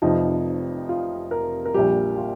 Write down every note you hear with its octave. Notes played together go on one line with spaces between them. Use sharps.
F1 F2 C3 F3 D#4
F4
A#4
A#4
A#1 A#2 G3 G4
F4